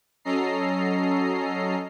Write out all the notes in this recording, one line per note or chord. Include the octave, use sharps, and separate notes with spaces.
F#3 C#4 A4 D#5 A#5 C7